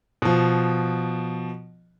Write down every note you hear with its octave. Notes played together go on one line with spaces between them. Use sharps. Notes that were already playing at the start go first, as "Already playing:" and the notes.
B2 F3